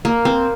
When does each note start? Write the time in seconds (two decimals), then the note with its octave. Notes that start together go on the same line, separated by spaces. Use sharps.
0.05 A#3
0.25 C4